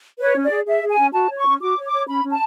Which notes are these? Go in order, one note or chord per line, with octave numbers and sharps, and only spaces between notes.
B4 C#5
C#4
D5
G#4
G#4 E5
G#4
G#5
C#4
F#4 A5
C#5
C#6
C#4
F#4 D6
C#5
D6
C#5
C#4 B5
C#4
A5